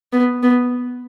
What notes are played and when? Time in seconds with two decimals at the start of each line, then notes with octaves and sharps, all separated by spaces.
0.13 B3
0.43 B3